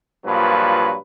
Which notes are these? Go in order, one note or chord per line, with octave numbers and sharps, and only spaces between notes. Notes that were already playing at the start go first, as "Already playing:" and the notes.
G2 A#2 F3 F#3 B4